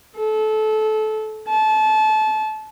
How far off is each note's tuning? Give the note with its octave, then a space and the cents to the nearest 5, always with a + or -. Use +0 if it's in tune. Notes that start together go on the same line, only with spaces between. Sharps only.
A4 -25
A5 -25